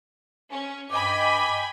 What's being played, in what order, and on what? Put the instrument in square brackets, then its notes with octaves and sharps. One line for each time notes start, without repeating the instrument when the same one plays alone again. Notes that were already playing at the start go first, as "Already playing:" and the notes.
[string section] C#4
[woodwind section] G2 D#5 D6 [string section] G5 G#5 B5